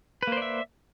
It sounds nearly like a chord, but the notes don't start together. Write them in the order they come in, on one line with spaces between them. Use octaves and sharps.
B4 A#3 C5 D5 E5